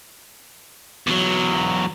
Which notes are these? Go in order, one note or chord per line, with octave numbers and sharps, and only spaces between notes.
E2 F#3